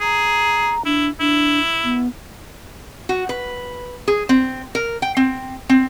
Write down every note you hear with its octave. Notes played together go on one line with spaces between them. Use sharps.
G#4 A#5
D4 E4
D4 E4
B3
F#4
B4
G#4
C4
A#4
G5
C4
C4